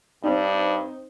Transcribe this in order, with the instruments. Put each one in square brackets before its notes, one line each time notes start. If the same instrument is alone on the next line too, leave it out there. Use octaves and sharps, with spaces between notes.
[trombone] G2 [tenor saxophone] G3 [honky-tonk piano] C4 D#4